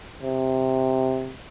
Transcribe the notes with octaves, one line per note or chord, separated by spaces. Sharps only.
C3